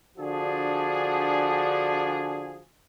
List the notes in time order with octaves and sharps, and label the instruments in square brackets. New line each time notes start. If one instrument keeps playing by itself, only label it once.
[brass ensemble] D3 F3 D4 F#4 G#4